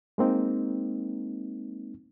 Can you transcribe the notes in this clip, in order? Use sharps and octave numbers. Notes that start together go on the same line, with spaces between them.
G#3 A#3 C4 D#4